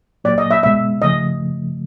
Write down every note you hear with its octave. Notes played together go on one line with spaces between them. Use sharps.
A#2 F#3 A#3 D5
D#5
E5
B2 G#3 B3 E5
C#3 F3 A3 D#5